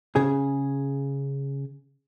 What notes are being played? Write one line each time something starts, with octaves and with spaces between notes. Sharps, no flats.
C#3 G#4